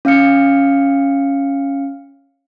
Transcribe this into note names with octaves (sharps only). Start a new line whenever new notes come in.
C#4 F5 F6 C#7